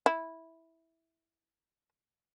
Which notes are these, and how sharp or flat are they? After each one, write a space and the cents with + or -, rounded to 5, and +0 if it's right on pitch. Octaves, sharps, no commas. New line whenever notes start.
E4 -10